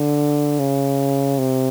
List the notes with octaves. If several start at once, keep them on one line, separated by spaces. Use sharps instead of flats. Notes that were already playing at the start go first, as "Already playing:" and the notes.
Already playing: D3
C#3
C3